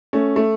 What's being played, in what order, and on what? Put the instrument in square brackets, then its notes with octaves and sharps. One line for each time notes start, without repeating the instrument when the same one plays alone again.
[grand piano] A3 C#4
A3